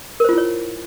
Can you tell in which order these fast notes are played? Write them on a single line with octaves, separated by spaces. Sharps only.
A#4 C5 F4 E4 C#5